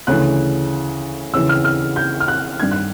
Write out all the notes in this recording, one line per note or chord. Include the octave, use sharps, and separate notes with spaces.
D2 C#3 E3 F#6
D#2 C#3 E3 E6
F6
F6
G6
F6
F#6
G2 D#3 G#6
F#6